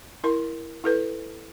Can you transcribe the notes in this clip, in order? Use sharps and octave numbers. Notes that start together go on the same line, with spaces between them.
E4 A#4 C6
E4 A4 B4